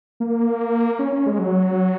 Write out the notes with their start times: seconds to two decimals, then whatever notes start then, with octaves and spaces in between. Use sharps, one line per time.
0.20 A#3
0.99 C#4
1.12 C#4
1.26 G#3
1.39 F#3